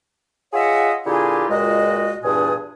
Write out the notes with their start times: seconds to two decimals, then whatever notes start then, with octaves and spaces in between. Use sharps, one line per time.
0.53 F4 G#4 C#5 D#5 E5 F#5
1.05 A#2 D3 E4 F4 G4 G#4
1.49 C#2 A#2 G#3 F#4 D#5
2.24 E2 G2 A#2 D4 G#5 D#6